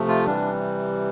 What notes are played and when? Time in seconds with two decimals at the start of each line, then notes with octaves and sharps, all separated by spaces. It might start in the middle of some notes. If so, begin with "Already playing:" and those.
Already playing: C3 F3 A3
0.08 F4
0.26 C3 E3 G3 D4